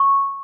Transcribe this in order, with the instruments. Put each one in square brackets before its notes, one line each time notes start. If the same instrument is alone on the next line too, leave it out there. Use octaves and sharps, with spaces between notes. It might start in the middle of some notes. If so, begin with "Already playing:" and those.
Already playing: [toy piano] C#6